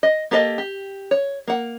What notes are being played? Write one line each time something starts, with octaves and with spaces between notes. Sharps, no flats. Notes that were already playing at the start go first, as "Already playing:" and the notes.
D#5
A#3 G4 A4 C#5 D#5
G4
C#5
A#3 F#5